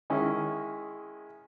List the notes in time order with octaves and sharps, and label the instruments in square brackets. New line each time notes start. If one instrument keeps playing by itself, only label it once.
[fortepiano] D#3 G#3 C#4 E4